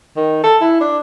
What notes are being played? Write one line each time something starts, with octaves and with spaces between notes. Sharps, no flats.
D#3
A4
E4
D4